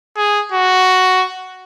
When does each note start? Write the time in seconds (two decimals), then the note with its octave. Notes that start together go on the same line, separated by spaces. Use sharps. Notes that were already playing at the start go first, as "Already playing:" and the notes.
0.16 G#4
0.52 F#4